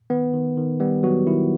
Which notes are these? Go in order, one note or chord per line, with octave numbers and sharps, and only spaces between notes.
D#3 B3 B4
D#3
D#3
G3 B3 G4
F#3 B3 F#4
D#3 E4